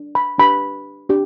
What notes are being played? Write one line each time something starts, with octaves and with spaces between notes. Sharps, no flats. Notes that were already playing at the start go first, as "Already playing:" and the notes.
Already playing: D4
B5
D4 G4 B4 B5
D4 G4